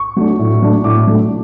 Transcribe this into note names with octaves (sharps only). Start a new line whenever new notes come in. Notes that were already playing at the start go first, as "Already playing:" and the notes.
Already playing: C#6
F#3 A3 D4
A2
F#3 A3 D4
A2 D6
F#3 A3 D4